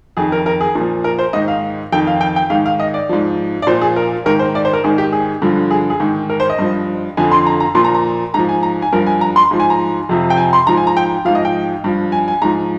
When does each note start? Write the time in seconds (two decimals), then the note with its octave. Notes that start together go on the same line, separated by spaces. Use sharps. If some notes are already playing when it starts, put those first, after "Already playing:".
0.17 F2 D#3 G#4
0.32 A#4
0.46 A#4
0.61 G#4
0.75 A#2
0.80 F3
1.04 A#4
1.19 C5
1.33 G#2 D#3 D#5
1.48 F5
1.92 F2 D#3 G5
2.07 F5
2.21 G5
2.36 G5
2.50 G#2 D#3 F5
2.66 F5
2.80 D#5
2.94 D5
3.09 G#2 F3
3.62 D5
3.67 A#2 F3 C5
3.81 G#4
3.96 A#4
4.26 G#2 D#3 A#4
4.39 C5
4.55 D5
4.65 C5
4.73 A#4
4.84 G#2 D#3 G#4
4.98 G4
5.12 G#4
5.42 G2 D3 F3
5.71 G#4
5.90 G#4
6.00 G#2 D#3
6.30 A#4
6.40 C5
6.50 D#5
6.59 G2 F3
7.17 F2 D3 F3 G#5
7.32 C6
7.47 A#5
7.60 A#5
7.75 A#2 F3 C6
7.84 A#5
7.95 A#5
8.34 G#2 F3 A#5
8.49 G#5
8.63 A#5
8.82 G#5
8.93 G2 F3 A#4
9.07 G#5
9.21 A#5
9.36 C6
9.51 G#2 F3
9.60 G#5
9.70 A#5
10.09 F2 C3 F3
10.30 G5
10.37 G#5
10.53 C6
10.67 G#2 F3 A#5
10.77 G#5
10.87 A#5
10.97 G5
11.25 G#2 F3 F5
11.35 D#5
11.45 G5
11.84 G2 F3
12.12 G#5
12.28 G#5
12.42 G#2 F3 A#5